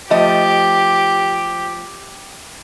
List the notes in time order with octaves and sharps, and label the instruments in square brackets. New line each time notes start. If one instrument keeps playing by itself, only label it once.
[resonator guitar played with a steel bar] F3 A3 D#5 [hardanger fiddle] G4